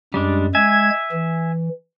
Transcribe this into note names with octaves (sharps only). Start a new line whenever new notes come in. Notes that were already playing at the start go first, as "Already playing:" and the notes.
F#2 G3 G#3 D4
G#3 E5 G#5 G#6
E3